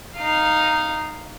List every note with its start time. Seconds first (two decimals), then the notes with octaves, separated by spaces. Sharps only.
0.17 D#4 F5